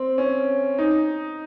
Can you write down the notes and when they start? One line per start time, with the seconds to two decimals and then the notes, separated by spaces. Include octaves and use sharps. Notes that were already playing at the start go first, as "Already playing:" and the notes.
Already playing: C4
0.18 C#4
0.78 D#4